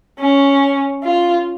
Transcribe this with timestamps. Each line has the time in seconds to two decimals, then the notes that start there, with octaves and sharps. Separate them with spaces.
0.19 C#4
1.03 F4